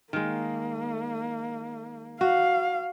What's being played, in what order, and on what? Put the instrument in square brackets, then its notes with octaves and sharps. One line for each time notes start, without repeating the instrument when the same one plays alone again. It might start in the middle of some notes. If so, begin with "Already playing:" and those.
[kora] D#3 G#3 [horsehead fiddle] A#3
[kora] F#4 [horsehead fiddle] F5